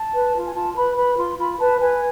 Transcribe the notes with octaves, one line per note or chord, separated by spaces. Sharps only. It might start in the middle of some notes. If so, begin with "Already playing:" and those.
Already playing: A5
B4
F4
G#5
F4 A5
B4 B5
B4 B5
F4 C6
F4 B5
B4 A5
B4 G#5